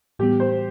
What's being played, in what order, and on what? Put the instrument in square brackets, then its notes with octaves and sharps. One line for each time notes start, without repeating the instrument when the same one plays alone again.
[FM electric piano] A2 E3 G3 B3 [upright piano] G4
[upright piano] C5